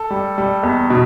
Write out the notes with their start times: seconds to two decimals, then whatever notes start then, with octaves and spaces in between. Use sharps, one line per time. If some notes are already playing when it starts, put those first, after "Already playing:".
Already playing: A4
0.11 G3
0.38 G3
0.63 E2
0.90 B2